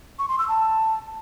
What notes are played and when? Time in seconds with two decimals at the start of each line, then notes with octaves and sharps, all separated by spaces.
0.19 C#6
0.29 C6
0.39 E6
0.49 A5